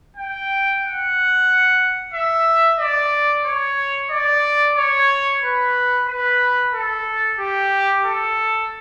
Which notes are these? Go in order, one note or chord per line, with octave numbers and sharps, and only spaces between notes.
G5
F#5
E5
D5
C#5
D5
C#5
B4
B4
A4
G4
A4